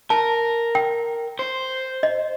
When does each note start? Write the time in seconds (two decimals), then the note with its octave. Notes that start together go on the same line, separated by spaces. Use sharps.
0.10 A#4 A5
0.75 G5
1.39 C5
2.03 D#5